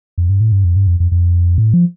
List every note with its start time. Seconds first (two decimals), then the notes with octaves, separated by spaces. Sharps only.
0.18 F2
0.29 G2
0.41 A2
0.52 G2
0.64 F2
0.76 G2
0.87 F2
1.00 F2
1.11 F2
1.58 A2
1.74 F3